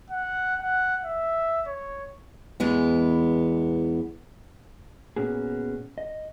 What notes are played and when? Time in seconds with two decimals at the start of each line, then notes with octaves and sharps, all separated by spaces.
0.10 F#5
0.61 F#5
1.04 E5
1.67 C#5
2.60 E2 E3 G#3 B3
5.16 A#2 B3 C#4 F#4 G#4
5.98 D#5